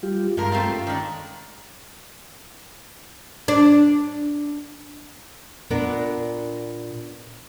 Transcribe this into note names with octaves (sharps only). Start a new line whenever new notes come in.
G3 F4 G4
G2 F3 G#3 F4 A#4
A3 C4 F4
C#4
D#3 D4
D4
A#2 B3 D4 A#4